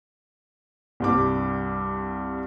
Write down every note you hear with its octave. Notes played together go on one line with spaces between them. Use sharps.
C2 G2 D6